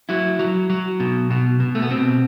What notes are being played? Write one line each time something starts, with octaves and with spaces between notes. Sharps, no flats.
F#3 E4
F#3
F#3
B2
B2
B2
A3
B3
B2 C4